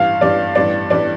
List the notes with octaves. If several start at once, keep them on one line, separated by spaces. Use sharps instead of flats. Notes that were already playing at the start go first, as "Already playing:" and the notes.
Already playing: A1 G2 G3 F5
A1 G2 G3 D5
A1 G2 G3 D5
A1 G2 G3 D5